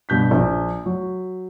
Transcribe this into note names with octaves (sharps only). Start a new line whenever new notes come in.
G2 B2 G6 B6
A#1
F#3